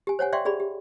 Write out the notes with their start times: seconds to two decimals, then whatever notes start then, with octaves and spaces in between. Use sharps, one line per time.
0.07 G4 G#5
0.19 C5 C#5 F#5 G#5
0.33 D5 E5 F5 G5 C6 C#6
0.45 G4 G#4 D5 B5
0.60 G4